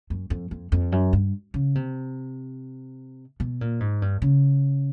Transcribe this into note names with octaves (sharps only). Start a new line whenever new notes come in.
F#2
F2
F2
F2
F#2
G2
C#3
C3
B2
A#2
G#2
G2
C#3